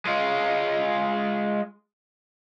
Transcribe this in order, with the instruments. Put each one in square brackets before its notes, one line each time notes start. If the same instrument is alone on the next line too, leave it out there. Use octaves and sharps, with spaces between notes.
[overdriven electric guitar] G#3 F4